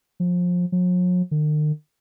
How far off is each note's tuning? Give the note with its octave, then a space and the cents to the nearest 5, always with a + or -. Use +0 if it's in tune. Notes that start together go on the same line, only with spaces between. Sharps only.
F3 +25
F#3 -45
D#3 -45